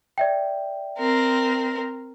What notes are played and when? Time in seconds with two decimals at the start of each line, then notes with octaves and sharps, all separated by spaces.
0.18 D5 E5 G5
0.98 C4 A#4